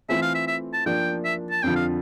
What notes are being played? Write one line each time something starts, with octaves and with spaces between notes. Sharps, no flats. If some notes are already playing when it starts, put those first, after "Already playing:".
E3 A3 C4 F4 A4 E5
F5
E5
E5
A5
F3 A#3 D4 G5
E5
A5
F2 D3 F3 G5
F5